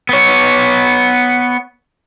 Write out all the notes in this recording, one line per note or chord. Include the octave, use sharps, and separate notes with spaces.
B3 C#5